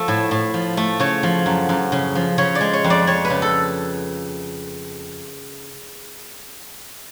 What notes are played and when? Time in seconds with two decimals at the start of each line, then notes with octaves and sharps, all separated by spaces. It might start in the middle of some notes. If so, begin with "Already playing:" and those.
Already playing: F3 A3 A4
0.08 A2
0.31 A2
0.54 F3
0.77 A3
1.00 C#3 C#5
1.23 F3
1.46 F#2
1.69 F#2
1.92 C#3
2.15 F3
2.38 C#3 C#5
2.55 D5
2.61 G#3
2.73 C#5
2.84 F2
2.90 D5
3.07 F2 C#5
3.25 B4
3.30 C#3
3.42 A4